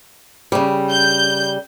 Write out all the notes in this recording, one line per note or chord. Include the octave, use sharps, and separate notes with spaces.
C#3 G3
G6